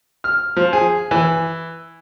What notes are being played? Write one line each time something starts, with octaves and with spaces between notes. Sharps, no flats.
F6
F3
G#4
E3